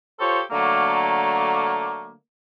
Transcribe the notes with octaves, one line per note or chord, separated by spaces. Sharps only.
F4 G4 A4 C5 C#5
D3 F#3 A3 A#3